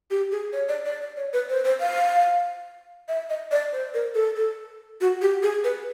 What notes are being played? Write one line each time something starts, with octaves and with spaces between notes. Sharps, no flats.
G4
G#4
C#5
D5
D5
D5
C#5
B4
C5
C5
F5
E5
D#5
D5
C5
A#4
A4
A4
F#4
G4
G#4
B4